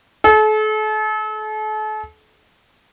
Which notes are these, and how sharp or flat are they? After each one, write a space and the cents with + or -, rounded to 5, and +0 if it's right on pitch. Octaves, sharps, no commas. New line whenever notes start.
A4 -40